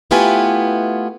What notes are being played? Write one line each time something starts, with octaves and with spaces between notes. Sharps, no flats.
A3 B3 E4 F4 G4 G#5